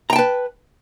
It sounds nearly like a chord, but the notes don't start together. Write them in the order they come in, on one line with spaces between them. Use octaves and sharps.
A#5 G5 A5 B4